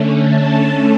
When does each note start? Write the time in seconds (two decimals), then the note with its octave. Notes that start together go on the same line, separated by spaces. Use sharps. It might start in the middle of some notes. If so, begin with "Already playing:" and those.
Already playing: D3 A3 C#4
0.17 A5